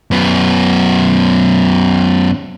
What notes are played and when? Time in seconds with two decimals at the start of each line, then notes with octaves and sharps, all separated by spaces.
0.11 F#2 B3